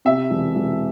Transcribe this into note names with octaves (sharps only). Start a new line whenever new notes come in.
C3 E5
E1
E1